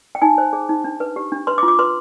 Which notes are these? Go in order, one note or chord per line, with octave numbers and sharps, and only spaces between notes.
G5
D#4 G#5
C5
G#4
D#4
D4
B4
G4
D4
B4 C6
D6
F4
D6
B4 C6